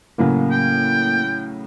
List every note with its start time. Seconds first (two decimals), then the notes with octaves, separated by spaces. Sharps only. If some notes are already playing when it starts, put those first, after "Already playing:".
0.18 A2 C#3 F#3 A#3
0.51 G5